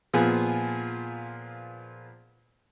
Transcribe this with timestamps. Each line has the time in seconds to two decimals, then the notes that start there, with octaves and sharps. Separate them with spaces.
0.14 A#2 F3 B3 G#4 G#5